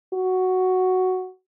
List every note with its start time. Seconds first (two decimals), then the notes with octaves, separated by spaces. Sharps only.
0.14 F#4